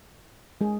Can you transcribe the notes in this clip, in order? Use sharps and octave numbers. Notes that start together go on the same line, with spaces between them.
G#3 G#4